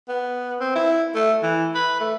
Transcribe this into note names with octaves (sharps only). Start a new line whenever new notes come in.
B3
C4
E4
A3
E3
B4
A3